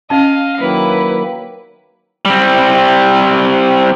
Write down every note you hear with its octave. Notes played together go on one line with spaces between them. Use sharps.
C#4 D#5 F5 A5
D#3 F#3 A#3 E4 B4
G3 C4